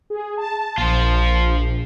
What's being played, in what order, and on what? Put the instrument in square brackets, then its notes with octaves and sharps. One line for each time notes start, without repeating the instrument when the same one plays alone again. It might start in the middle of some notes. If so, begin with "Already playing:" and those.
[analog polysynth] G#4
A5
[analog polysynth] A#1 [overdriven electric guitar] F4 C5